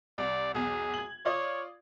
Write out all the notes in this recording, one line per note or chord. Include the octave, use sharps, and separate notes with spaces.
C2 D5
B1 E2 G#4
G#6 F#7
F4 C#5 D5 D#6